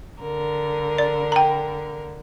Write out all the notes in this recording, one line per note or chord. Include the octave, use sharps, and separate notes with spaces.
D3 A#4
D5
G5 A#5